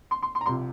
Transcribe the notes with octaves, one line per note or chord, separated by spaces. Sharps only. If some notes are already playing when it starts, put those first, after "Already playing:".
C6
C6
C6
A#5
C2 C3 F3 C6